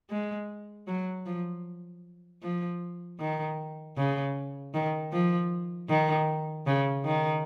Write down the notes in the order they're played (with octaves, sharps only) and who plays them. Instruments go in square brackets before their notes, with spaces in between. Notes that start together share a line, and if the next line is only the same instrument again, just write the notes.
[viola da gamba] G#3
F#3
F3
F3
D#3
C#3
D#3
F3
D#3
C#3
D#3